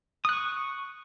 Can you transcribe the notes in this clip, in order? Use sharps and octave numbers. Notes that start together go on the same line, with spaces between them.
C#6 D#6 F#6